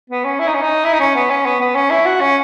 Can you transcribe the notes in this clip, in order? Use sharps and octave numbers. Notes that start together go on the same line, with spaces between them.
B3
C#4
E4
D#4
C#4
D#4
E4
D#4
C#4
B3
C#4
B3
B3
C#4
E4
F#4
C#4